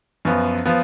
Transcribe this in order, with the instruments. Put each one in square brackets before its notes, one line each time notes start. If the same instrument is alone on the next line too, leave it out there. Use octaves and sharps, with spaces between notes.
[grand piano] F#2 F3 B3
F3 B3